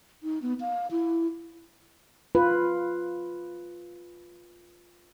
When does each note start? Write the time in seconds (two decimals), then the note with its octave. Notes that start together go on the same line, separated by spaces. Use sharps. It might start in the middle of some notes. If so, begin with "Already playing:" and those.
0.23 D#4
0.42 B3
0.60 F5
0.91 E4
2.35 F4 B4